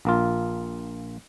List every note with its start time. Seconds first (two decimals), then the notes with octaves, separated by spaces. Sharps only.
0.05 A#1 A#3 F4